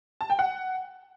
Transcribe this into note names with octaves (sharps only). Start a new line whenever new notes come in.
A5
G5
F#5